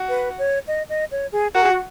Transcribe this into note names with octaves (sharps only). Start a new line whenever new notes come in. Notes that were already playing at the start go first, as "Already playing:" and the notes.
Already playing: F#4
B4
C#5
D#5
D#5
C#5
G#4
F#4 A#4
G#4
F#4